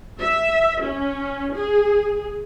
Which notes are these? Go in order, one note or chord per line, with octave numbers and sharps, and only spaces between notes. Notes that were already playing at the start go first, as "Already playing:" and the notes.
E5
C#4
G#4